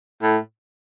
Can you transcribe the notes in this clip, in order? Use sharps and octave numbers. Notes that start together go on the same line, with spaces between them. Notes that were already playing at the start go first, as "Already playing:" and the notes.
A2